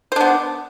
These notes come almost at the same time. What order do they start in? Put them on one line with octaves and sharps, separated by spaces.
C5 D4 B3